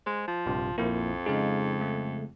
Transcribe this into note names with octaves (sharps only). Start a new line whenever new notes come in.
G#3 C5
F3
A#1 G2 C3
A#1 F2 F3 A#3 E4
C#3 G#3 D#4 F5
A3